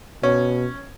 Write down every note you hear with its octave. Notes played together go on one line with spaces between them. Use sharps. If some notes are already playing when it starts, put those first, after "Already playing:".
B2 C#4